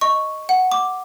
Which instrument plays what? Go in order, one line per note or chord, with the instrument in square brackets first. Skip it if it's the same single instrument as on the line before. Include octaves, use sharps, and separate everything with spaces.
[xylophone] D#5 C#6
F#5
D6